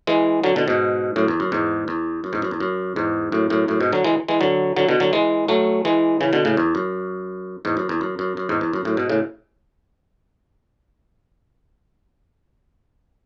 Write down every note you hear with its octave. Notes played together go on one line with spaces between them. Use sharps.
E3 G#3
D3 F#3
B2 D3
G#2 B2
F#2 A2
E2
F#2
E2 G#2
E2
F#2
E2 G#2
F#2
E2
F#2
E2 G#2
F#2 A2
F#2 A2
F#2 A2
G#2 B2
D3 F#3
E3 G#3
E3 G#3
D3 F#3
D3 F#3
B2 D3
D3 F#3
E3 G#3
F#3 A3
E3 G#3
C#3 E3
B2 D3
A2 C#3
E2
F#2
E2 G#2
F#2
E2
F#2
F#2
F#2
E2 G#2
E2
F#2
F#2 A2
G#2 B2
A2 C#3